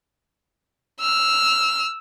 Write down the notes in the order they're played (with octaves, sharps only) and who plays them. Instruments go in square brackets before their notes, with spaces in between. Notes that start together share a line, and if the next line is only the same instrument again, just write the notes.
[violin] E6 F6